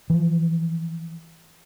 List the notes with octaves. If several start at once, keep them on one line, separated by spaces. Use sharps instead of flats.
E3 F3